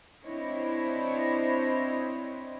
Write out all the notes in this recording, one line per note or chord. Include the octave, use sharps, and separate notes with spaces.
C4 D4 E4 C5 C#5 D#5